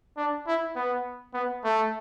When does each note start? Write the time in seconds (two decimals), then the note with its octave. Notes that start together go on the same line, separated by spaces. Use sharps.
0.17 D4
0.47 E4
0.76 B3
1.34 B3
1.64 A3